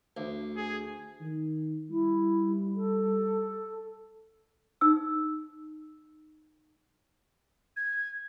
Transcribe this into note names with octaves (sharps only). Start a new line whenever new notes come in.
D2
G#4
D#3
G3 E4
A4
D#4 E6
G#6